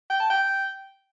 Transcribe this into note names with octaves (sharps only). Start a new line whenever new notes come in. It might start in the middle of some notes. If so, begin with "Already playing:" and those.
G5
A5
G5